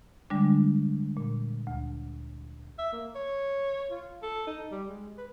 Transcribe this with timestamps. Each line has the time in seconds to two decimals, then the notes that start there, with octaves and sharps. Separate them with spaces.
0.30 D3 G3 G#3 D4
1.17 A#2
1.67 D2
2.78 E5
2.93 A#3
3.15 C#5
3.91 F4
4.23 A4
4.47 D#4
4.72 G3
4.89 G#3
5.18 B4